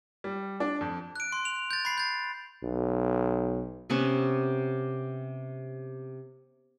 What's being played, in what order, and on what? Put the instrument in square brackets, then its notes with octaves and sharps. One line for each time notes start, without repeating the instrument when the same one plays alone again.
[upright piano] G3
D4
F2
[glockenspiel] F#6 D7
C6
F7
G6 A6
B5 C7
G6 A6
[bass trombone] B1
[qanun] C3 B3 C#4